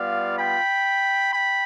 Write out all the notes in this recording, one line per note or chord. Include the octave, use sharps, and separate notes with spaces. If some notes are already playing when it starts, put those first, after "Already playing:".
Already playing: G3 B3 F4 D5 F5
G5 B5
G5 B5